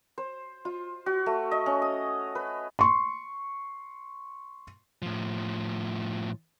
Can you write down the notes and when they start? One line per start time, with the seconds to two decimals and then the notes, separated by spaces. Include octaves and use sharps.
0.18 C5
0.65 F4
1.06 F#4
1.26 A3
1.51 D#5
1.66 C#4
1.82 D#6
2.35 B4
2.79 C6 C#6
5.02 A2 F3